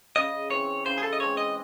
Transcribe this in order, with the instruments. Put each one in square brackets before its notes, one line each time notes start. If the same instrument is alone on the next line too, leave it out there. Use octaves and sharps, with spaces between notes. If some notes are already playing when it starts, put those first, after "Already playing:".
[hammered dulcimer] C#3 [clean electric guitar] D#5
[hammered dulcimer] E3 C4 [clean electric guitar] C#5
[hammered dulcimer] C#3 [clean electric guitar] C5
[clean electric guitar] G#4
A4
D#5
[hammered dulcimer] E3 G#3 C4 [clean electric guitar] C#5
[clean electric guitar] D#5